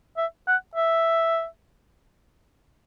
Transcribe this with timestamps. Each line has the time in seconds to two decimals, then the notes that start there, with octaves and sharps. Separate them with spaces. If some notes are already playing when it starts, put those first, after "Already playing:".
0.17 E5
0.47 F#5
0.75 E5